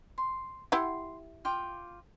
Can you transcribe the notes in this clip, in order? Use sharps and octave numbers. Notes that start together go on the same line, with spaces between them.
C6
E4 G4 F#5 C6
F4 G5 D6